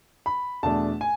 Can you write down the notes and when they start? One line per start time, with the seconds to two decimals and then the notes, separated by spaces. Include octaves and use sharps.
0.26 B5
0.63 E2 B2 A3 D4 A5
1.01 G#5